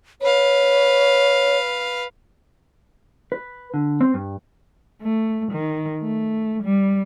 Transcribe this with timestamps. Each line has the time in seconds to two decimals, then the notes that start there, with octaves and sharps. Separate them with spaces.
0.22 B4 C#5 F5
3.32 B4
3.74 D3
4.01 C4
4.14 G2
5.00 A3
5.51 D#3
6.02 A3
6.63 G3